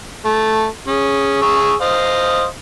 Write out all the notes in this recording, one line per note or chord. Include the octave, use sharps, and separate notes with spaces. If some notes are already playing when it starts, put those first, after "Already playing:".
A3
C#4 G#4
G#4 C#6 E6
C5 D#5 F5